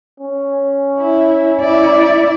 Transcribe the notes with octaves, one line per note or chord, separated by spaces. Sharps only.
C#4
E4
E4 D5